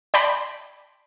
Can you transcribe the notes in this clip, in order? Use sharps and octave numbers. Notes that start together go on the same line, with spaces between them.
D5 G5 A5 B5 C6 D6